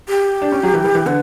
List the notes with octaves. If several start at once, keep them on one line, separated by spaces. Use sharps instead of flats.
G4
D4
C#4
F#3
E3
E3
E3
D3 B4